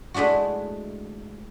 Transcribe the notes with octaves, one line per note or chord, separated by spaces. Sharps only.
G#3 A3 D4 E4 F#4